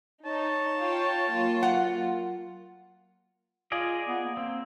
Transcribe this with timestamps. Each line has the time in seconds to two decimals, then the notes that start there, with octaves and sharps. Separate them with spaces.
0.25 D#4 C#5 A5
0.80 F4 G5
1.29 F#3 A#3 F4
1.63 F#5
3.72 F4 G#4 D5 D#5
4.08 B3
4.24 A#3
4.37 A#3 C4